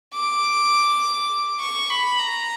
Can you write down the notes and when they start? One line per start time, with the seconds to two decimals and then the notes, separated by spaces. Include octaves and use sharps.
0.14 D6
1.61 C#6
1.90 B5
2.19 A#5